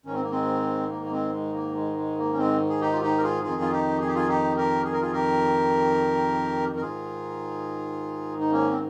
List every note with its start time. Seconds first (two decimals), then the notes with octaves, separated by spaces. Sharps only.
0.05 G#2 D#3 C#4
0.13 C4
0.22 A#3
0.30 G#3 C4
0.90 A#3
1.04 A#3
1.11 G#3 C4
1.32 G#3
1.53 A#3
1.75 G#3
1.96 G#3
2.17 A#3
2.32 C#4
2.38 G#3 C4
2.69 G#4
2.81 D#4 G4
2.93 F4
3.02 D#4 G4
3.18 A#4
3.23 F4 G#4
3.43 F2 D#3 F4 G#4
3.61 F4
3.72 D#4 G4
4.00 G#4
4.07 G4
4.15 F4 G#4
4.28 D#4 G4
4.56 G4 A#4
4.84 G#4
4.92 A#4
5.01 F4 G#4
5.13 G4 A#4
6.76 A#4
6.81 G#2 D#3 F4 G#4
8.39 D#4
8.51 A#3 C#4
8.69 C4